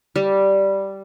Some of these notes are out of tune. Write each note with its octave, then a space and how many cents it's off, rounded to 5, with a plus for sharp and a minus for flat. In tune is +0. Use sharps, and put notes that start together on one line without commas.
G3 -5